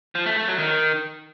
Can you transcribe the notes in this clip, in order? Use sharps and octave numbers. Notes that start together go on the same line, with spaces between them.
F3
A3
A3
F#3
D#3